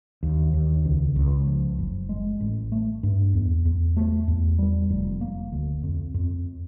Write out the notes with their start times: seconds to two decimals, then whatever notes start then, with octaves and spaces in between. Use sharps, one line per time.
0.23 D#2
0.54 D#2
0.85 C#2
1.16 C#2
1.47 F3
1.79 F#1
2.09 G#3
2.41 A1
2.72 A3
3.03 G2
3.34 E2
3.65 E2
3.97 A3
4.28 E2
4.59 G3
4.90 F1
5.21 A#3
5.52 D2
5.83 F2
6.14 F2